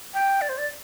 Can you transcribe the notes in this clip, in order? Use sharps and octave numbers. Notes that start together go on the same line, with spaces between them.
G5
D5
C5
D5